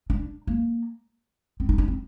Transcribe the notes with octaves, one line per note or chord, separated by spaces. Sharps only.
D4
A#3
C4
D#4
D4
C4